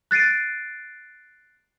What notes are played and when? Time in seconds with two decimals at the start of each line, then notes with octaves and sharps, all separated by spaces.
0.11 F#6 A6 C7 D7 D#7